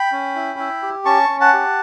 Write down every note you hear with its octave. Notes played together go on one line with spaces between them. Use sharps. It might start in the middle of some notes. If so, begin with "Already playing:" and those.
Already playing: G5 B5
C#4
E4
E4
G4
C#4 A5 C#6
C#4
F#5 A5
G4